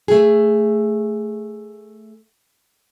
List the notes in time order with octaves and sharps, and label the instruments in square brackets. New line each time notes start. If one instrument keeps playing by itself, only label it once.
[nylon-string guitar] A3 G#4